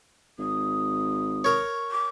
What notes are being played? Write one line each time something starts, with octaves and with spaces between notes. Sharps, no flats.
G#1 D#6
A#4 C#5
D6